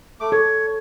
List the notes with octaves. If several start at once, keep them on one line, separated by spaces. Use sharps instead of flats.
A3 D6
A4 C#5